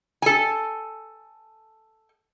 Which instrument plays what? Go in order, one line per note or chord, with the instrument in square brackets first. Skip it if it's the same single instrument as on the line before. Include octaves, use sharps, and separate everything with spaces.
[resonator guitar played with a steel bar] A4 G#5